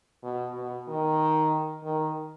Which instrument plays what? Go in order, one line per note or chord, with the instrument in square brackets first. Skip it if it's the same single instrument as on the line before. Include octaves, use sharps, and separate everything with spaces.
[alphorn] B2
B2
D#3
D#3